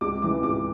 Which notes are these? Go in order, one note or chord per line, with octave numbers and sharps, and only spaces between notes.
C#2 D6
C#3 E3 D6
C#2 D6